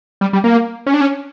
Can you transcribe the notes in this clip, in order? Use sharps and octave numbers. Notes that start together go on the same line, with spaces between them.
G3
G3
A#3
C#4
D4
C#4